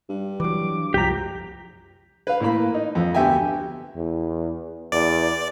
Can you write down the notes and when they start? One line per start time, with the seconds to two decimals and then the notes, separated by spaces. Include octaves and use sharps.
0.09 G2
0.40 E3 F#3 D6
0.94 C2 F#2 F3 G4 A#5 B6
2.27 B4 F5
2.40 A2 A#3 B5
2.74 D#4
2.95 F2
3.14 D2 B3 G4 E5 G5 G#5
3.96 E2
4.92 E2 D5